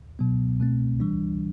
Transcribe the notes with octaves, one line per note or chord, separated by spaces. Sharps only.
B2 F#3 B3
B2 A3 C4
E3 G3 D4